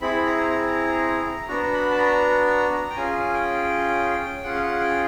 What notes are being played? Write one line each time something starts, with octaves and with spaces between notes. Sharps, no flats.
C4 E4 G#4 B5
A#5
A#5
B3 D4 F#4 A#5
B5
A5
A#5
G5
C#4 F4 G#4 G#5
G5
C#4 F4 G#4 F#5
F5
F#5
G5